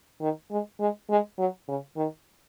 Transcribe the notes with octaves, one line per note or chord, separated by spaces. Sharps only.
D#3
G#3
G#3
G#3
F#3
C#3
D#3